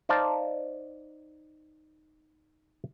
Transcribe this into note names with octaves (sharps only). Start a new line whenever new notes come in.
D#4 C5 D5 F5 A5